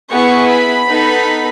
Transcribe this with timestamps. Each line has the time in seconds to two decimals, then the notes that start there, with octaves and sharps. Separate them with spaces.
0.11 B3 E4 G#4 C#6
0.49 B5
0.86 B3 D#4 A4